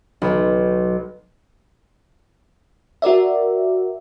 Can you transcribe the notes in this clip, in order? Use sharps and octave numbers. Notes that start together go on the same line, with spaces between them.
B1
F#4 A#4 D5 E5